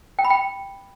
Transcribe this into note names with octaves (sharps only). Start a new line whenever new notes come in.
G5
B5
G5